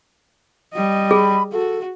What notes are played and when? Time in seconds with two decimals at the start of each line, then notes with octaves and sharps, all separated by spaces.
0.74 G3 D#5
1.11 G#4 B5
1.53 F#4 A4